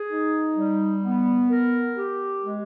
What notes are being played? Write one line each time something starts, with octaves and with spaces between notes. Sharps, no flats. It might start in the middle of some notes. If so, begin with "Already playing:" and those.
Already playing: G#4
D#4
G3
B3
A#4
G4
G#3